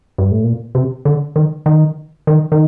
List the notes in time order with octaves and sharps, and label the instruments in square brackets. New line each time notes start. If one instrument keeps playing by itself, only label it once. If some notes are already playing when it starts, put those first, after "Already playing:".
[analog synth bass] G2
A2
A#2
C3
D3
D#3
D#3
D#3
D#3